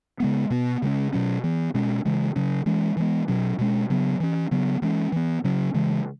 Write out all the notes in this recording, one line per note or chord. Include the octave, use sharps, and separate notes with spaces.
C#3 G#3 B3
B2 B3
C#3 G#3 C#4
B2 F#3 C#4
E3 B3
B2 G#3 C#4
C#3 E3 G#3
C#3 F#3 C#4
E3 G#3 C#4
E3 G#3 B3
B2 F#3 C#4
B2 G#3 C#4
C#3 F#3 B3
E3 C#4
C#3 F#3 B3
E3 G#3 C#4
E3 B3
C#3 F#3 C#4
C#3 E3 G#3